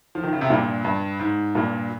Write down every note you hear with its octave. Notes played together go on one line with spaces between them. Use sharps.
F3
D#3
C#3
C3
G2 A#2
G2
G#2
G2 A#2